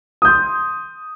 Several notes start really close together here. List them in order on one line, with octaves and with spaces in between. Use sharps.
D#6 G6 C6